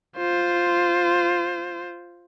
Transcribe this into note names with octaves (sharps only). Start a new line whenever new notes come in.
F4 C5